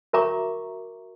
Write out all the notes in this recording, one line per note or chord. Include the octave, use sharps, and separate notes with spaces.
F#4 A#4 E5 A#5 C#6 D6